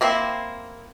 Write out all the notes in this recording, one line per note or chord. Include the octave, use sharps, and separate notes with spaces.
A#3 C4 E4